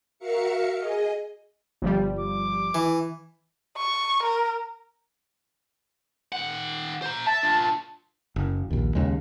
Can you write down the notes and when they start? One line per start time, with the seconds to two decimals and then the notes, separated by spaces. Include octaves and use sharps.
0.19 F#4 A#4 E5 F5 C#7
0.78 G#4 D#5
1.82 G1 F3 G3
2.19 D6
2.75 E3
3.77 C#6
4.23 A#4
6.32 D#3 F#5
7.02 C5 A#5
7.26 E5 A5
7.43 D4 F4
8.36 F#1
8.70 A#1 D#2
8.95 D#2 C#3 G#3